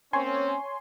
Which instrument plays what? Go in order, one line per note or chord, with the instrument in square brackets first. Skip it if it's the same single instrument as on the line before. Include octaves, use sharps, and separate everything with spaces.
[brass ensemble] A#3 C4 C#4 [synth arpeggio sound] C#5 G#5 C6